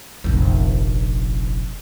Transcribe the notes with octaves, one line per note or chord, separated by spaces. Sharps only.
F1 A#1